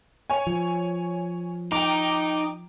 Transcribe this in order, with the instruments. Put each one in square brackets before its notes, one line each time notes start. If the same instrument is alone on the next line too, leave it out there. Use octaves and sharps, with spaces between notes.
[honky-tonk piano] C#5 G#5
[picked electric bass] F3
[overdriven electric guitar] D#4 [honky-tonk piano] G5 A#5 [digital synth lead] D6